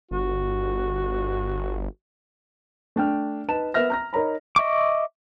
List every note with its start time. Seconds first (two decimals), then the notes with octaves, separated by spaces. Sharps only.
0.11 G1 F#4
2.96 A3 D4 G5 F6
3.48 D#4 B4 A5 E7
3.74 B3 A#4 E5 F6 A#6
3.90 A#5 F6 A#6
4.13 D#4 A#4 C#5 A#5 B5
4.56 D#5 E5 C#6 D6